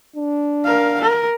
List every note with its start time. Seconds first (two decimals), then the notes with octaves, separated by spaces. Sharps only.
0.16 D4
0.65 A#4 F5
1.01 A#4